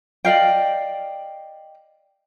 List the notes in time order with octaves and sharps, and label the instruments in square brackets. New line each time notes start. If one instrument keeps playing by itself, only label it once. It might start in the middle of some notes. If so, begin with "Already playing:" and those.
[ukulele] D5 D#5 F5 G5